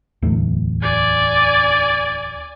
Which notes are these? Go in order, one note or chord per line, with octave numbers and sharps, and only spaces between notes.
D1 E2 A3
D5 G#5